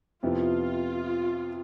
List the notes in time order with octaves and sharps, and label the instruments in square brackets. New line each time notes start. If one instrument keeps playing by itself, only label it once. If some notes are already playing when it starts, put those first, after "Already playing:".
[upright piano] F2 C3 F3 B3 E4 [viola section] F4